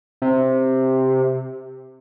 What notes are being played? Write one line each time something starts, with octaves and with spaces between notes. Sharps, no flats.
C3